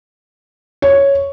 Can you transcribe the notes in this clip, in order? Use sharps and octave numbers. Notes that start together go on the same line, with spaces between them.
C#5